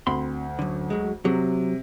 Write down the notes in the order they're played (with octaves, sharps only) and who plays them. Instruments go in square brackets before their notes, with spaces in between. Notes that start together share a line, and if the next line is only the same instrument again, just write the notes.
[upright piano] D2 [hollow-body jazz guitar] C4 B5 C6
[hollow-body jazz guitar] F#2 D3
F#3 G#3
[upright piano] C3 [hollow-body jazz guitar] F#3